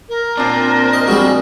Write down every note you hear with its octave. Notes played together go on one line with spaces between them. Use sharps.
A#4
A#2 C4 D4
D#5
G3 G#3 F#4